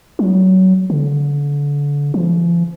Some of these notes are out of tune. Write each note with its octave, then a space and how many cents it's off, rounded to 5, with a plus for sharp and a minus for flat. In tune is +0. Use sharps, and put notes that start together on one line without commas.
F#3 +20
D3 -30
F3 -40